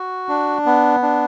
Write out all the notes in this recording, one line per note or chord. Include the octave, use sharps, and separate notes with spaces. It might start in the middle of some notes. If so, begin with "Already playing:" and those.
Already playing: F#4
D4
B3
D4